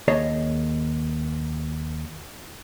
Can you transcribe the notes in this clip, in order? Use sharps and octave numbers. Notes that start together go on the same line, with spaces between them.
D#2 G#4 C#5 D#5 A5